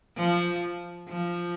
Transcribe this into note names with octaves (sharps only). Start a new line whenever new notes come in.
F3
F3